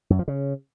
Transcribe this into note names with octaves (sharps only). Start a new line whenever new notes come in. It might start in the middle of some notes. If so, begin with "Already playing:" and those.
F#2
F3
C#3